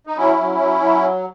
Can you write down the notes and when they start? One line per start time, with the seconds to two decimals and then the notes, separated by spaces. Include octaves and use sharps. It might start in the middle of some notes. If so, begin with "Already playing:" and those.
0.07 D#4
0.17 F#3 C#4 E4
0.38 F#3
0.60 F#3
0.80 F#3